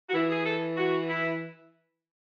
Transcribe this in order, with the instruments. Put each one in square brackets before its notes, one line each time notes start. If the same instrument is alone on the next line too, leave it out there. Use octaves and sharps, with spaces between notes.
[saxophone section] F#4
[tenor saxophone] E3 [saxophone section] E4
[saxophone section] G#4
A4
F#4
E4